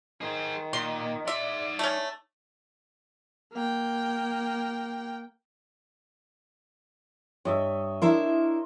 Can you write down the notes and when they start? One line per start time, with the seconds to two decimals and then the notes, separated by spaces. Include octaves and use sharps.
0.21 D#3 G#4 C5
0.73 A#2 C6
1.28 D#4 D5 E5 C6
1.79 A3 C#4
3.54 A#3 G5
7.45 G2 C#5 D#5 E5
8.02 D4 E4 A#4 E5 C6